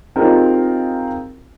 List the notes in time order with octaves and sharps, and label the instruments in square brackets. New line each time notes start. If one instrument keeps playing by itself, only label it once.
[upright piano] C4 D#4 F4 G4 G#4 A#4